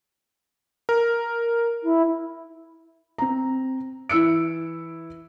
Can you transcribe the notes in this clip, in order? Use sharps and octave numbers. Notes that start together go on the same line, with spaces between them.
A#4
E4
C4 A#5
E3 E4 E6 C#7 D7